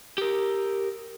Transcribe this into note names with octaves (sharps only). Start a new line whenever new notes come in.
G4 A#4